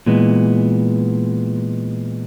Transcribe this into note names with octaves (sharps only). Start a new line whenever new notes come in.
A#2 E3 G#3 B3